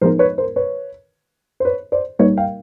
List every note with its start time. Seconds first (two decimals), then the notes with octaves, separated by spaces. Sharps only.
0.01 A2 F3 G#3 B3 D#4 A#4 C5
0.19 B4 C#5
0.38 A#4 C5
0.56 B4 C#5
1.60 C5
1.65 B4 C#5
1.92 C5 D5
2.19 C2 A#2 G3 A#3 D#4 B4 C#5
2.37 F5 G5